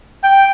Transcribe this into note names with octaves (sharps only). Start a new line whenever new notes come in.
G5